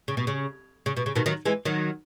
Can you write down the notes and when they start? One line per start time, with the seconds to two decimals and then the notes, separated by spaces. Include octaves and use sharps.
0.08 C#3
0.17 B2
0.27 C#3
0.86 C#3
0.97 B2
1.06 C#3
1.16 B2 D#3
1.26 D#3 F#3
1.45 E3 G#3
1.65 D#3 F#3